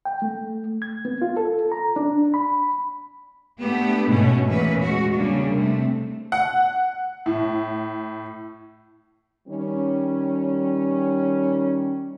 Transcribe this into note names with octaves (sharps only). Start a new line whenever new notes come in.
G5
A3
G#6
B3
F4
A4
A#5
D4
B5
A3 B3 D4 G4
G#2 B2 A3 C#4
E2 A#2 E3 A#3 C#4 B4
G#3 F#4
C#3 G3 A#3 D4
C3 A3
F#5
A2
D#3 G3 C#4